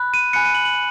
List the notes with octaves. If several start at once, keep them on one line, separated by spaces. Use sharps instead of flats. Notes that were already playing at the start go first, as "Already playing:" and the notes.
Already playing: B5 F#6
D#7
G#5 B5 F#6 C#7
D#7
F#7
F#7